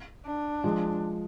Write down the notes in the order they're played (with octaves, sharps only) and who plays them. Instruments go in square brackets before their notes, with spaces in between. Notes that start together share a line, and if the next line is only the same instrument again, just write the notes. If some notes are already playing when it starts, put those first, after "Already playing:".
[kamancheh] D4
[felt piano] F3 G#3